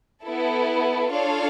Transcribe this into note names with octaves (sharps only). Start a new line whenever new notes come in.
B3 E4 A4
D4 F4 A4 C#5 F5